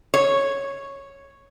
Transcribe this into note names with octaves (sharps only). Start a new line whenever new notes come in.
C#5